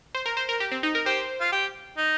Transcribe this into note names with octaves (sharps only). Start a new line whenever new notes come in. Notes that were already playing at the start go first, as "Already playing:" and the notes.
C5
A#4
C5
A#4
G4
C4
D#4
A#4
G4 C5
F4
G4
D#4